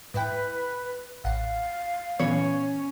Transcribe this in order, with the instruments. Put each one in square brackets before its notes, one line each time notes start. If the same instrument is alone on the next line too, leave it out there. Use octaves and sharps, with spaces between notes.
[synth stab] G#2 E4 G5 [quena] B4
[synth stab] A1 F#5 [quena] F5
[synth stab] A#2 E3 B3 [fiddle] C#4 [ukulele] C#5